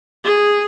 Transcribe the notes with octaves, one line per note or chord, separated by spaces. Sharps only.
G#4